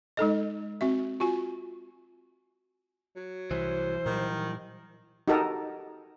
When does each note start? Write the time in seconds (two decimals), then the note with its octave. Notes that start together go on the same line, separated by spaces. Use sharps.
0.17 G#3 D#4 A4 D#5
0.81 C4 F#4 E5
1.20 F4 F#4 G#5
3.16 F#3
3.51 C2 E3 C5
4.06 A#2 D#3 F#3 G3
5.28 D#4 F#4 G4 A4 A#4 D#5